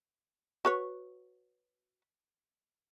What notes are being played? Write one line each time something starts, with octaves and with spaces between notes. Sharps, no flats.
F#4 B4 C#5